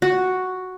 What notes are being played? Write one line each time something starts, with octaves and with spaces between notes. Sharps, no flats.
F#4